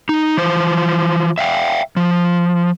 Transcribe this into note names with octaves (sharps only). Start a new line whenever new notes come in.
D#4
E3 F3 C5
E5 F5 G5
F3